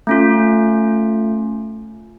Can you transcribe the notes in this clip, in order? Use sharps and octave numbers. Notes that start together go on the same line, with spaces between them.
A3 C#4 F4